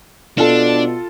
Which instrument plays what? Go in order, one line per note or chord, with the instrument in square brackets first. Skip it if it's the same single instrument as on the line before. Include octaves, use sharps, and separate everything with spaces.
[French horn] B2 [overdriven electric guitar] D4 [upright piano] F4 A4